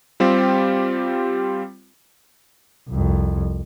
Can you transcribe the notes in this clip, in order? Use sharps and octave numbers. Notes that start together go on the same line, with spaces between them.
G3 C4 F4 G4
C2 F2